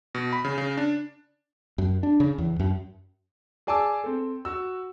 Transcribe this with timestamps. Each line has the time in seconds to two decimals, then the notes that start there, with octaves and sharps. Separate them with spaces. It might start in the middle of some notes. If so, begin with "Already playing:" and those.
0.15 B2
0.33 B5
0.45 C#3
0.58 C#3
0.77 D4
1.78 F#2
2.03 D4
2.20 C#3
2.38 E2
2.59 F#2
3.67 G#4 D5 G#5 A5 D6 E6
4.04 C4 A4
4.45 F#4 E6